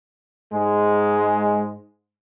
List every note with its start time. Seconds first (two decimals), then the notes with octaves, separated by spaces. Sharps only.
0.52 G#2 G#3